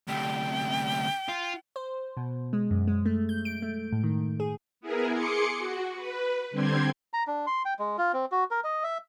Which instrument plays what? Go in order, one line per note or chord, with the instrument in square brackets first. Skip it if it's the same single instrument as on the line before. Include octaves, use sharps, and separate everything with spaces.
[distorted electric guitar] D2 C3 [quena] G5
[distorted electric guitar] F4
[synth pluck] C5
B2
G#3
F#2
G#3
A3
G6
D7
A3
A2
D#3
G#4
[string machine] B3 E4 G#4 A#4
G#4 C6 D6 C#7
F#4
B4
D3 G3 C4 G4 C6 G#6
[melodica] A#5
D4
C6
G5
G#3
F4
C4
F#4
A#4
D#5
E5